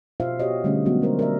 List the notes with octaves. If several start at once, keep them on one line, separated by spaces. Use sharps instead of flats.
B2 F4 C5 E5 F5
F#4 G4 C#5 D#5
D3 G3 A3 C#4 G#4
F#3 G#3 B3 F#4
G#3 A#4 C5
A#4 D5 E5